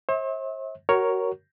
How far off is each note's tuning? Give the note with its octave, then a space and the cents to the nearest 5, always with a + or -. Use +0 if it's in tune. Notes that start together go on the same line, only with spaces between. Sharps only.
C5 +45 E5 -40
F#4 +25 A#4 +0 C#5 +0